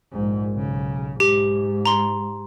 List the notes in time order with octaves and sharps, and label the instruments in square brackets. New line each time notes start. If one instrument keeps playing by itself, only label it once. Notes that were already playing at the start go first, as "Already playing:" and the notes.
[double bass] A#1 G#2
B1 C#3
[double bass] G#2 [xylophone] G4
[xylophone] A#5 C6